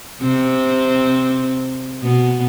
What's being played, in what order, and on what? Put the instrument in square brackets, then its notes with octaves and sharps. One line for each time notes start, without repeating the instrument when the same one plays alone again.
[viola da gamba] C3 C4
B2 B3